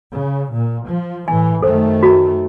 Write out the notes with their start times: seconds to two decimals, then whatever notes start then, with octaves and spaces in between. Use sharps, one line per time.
0.12 C#3
0.52 A#2
0.87 F3
1.28 A2 E3 G#5
1.62 F#2 D#3 A3 A4 C5
2.03 F#4 A#5